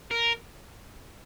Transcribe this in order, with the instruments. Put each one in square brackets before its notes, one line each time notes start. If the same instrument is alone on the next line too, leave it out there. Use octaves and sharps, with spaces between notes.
[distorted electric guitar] A#4